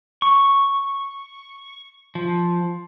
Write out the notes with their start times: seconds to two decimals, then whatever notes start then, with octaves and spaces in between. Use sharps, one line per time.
0.22 C#6
2.15 F3